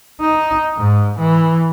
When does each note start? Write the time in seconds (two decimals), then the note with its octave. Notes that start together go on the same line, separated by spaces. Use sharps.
0.21 D#4
0.77 G#2
1.19 E3